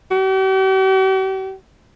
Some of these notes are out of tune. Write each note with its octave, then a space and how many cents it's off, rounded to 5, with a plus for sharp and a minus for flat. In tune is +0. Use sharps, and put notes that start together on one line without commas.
G4 -45